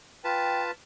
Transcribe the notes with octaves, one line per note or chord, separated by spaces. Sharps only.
F4 B4 G5 A5